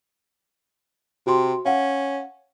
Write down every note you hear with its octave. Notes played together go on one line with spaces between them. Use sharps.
C3 F#4 C6
C#4 F5 F#5